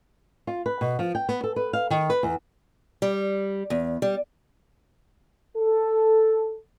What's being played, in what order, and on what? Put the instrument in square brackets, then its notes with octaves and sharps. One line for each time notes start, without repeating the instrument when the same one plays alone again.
[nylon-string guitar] F4
B4
B2
F3
G5
B3
A4
B4
F5
D#3
B4
E2
[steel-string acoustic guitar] G3
E2
G3
[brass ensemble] A4